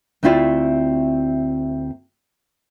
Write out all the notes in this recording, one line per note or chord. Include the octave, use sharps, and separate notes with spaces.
D2 A3 C4 E4 F4 D5